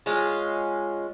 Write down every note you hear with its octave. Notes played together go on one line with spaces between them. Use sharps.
G#3 C#4 F4